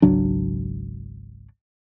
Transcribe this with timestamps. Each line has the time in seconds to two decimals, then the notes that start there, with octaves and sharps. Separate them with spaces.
0.02 G#1 C#2 F#3 D4